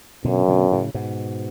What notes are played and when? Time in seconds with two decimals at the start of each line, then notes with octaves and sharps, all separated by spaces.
0.25 F#2 B2 D3
0.48 B2 D3
0.72 A2 C#3
0.94 G#2 B2